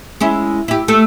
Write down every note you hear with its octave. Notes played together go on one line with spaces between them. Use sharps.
G#3 C#4 E4
E4 G4
A3 A4